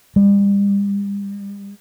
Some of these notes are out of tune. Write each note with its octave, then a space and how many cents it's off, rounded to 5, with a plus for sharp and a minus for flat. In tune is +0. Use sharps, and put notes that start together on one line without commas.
G3 +35